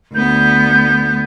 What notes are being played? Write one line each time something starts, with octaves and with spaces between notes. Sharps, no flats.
D2 B3 G6